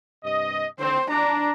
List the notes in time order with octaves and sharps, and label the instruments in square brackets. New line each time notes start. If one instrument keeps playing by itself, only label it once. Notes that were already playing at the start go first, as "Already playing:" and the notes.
[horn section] G2 C3 D#5
[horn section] D3 C4 [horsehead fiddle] C5
[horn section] D4 [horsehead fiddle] A#5